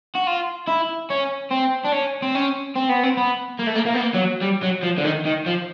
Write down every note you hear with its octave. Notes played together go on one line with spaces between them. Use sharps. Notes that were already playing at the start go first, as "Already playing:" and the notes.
F#4
F4
E4
C#4
C4
D4
C#4
C4
C#4
C4
B3
C4
B3
A#3
A3
A#3
A#3
B3
A#3
F#3
G3
F#3
F3
D3
D#3
D#3
F3